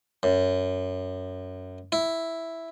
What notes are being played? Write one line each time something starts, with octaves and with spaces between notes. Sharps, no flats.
F#2
E4